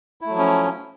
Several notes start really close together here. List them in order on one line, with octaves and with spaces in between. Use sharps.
E4 A3 F#3 F3 C#4